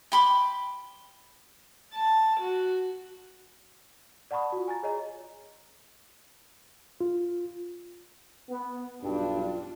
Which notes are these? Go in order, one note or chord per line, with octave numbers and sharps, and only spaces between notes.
G5 B5 C6 D6
A5
F#4
D5 F#5 A5 B5 C#6 D#6
F4 F#4
G#5 A#5 A6
G#4 C#5 D#5 A#5
F4
B3
B1 G2 D4 F4